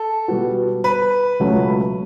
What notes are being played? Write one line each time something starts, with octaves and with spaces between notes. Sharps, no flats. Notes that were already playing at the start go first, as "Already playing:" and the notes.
Already playing: A4
B2 G3 B3 F#4
B4
C#2 B2 F#3 A3 C#4